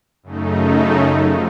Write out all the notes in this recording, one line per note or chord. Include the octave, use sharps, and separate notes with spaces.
F#2 C#3 A3 D#4
F3